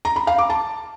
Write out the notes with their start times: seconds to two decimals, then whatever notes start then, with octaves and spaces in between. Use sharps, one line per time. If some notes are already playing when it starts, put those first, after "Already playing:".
0.05 A#5
0.16 B5
0.27 F5
0.38 D6
0.50 A5